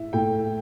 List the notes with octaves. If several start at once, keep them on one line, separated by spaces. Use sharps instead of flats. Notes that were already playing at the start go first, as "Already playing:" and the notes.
Already playing: A2 E4 E5
A2 G5